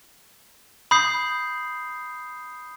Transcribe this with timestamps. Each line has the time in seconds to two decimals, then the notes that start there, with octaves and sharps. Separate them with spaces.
0.91 B5 D#6 G6 C7